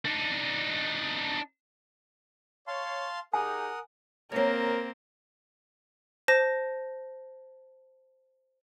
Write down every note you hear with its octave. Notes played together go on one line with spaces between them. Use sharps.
D4 D#4
C#5 F5 A5 C6
D#4 G4 G#4 A#4 F#5 G#5 D#6
A#3 C4 A#4 C5 C#5
C5 A5 A#6